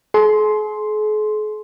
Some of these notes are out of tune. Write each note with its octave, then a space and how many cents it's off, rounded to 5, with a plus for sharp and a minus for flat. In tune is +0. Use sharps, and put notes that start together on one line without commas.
G#4 +45 C6 +0